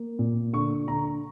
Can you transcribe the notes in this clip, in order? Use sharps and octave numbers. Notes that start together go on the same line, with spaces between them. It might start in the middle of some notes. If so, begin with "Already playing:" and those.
Already playing: A#3
A#2
D3 C#6
D3 A#5